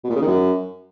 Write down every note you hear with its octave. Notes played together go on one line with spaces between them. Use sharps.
B2
A#2
C#3
D#3
F#2